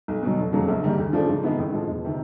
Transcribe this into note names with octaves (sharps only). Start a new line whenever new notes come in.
B1
B2 F#3
F1
F2 C#3 F#3 A#3
A#1
G#2 D#3 G3 A#3
D2
C#3 F3 A3 D4
G#2
D#3 G#3 B3 E4
A1
A2 F3 G#3
E1
C3 D#3